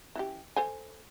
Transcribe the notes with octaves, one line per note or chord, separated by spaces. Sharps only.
E3 C#4 G4
A4 C5 G#5